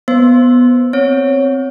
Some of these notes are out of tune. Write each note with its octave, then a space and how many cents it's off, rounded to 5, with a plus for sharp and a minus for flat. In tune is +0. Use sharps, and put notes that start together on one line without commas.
B3 +0 C5 +5
C4 -5 C#5 +0